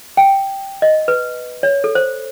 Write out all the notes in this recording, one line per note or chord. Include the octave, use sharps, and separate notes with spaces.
G5
D#5
B4
C#5
A4
C5